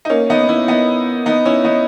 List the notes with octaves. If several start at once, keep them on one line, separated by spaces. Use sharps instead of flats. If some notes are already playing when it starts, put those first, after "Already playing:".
D#4
A#3 C#4
B3 D#4
C#4 E4
B3 D#4
B3 D#4
C#4 E4
B3 D#4